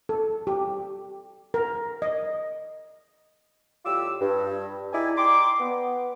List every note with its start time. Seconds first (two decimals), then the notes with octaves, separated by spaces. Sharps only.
0.09 A4
0.47 G4
1.54 A#4
2.02 D#5
3.85 A2 G3 F4 G4 D6 E6
4.21 G2
4.93 D#4 E4 G#4 D5 G5 G#5
5.17 D5 G5 A#5 C6 D6
5.60 B3